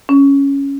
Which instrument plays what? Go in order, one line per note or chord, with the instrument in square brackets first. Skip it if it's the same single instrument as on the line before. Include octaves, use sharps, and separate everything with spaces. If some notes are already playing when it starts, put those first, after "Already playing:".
[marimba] C#4